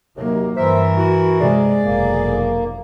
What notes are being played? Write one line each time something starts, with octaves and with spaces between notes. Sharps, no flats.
D#2 C3 F#3 A#3
G2 E3 A#4 C5 E5
E4 F#4
C3 G#3 G#4 D5
F1 B1 A#3